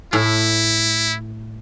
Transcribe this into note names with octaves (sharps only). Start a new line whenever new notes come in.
A2 E4